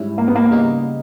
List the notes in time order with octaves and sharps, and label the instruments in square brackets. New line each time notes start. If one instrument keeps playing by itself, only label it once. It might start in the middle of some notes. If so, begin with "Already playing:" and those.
Already playing: [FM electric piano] G#2 G3 C#4 E4
[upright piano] A#3
B3
A#3
[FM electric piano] C#3 G3 B3 D#4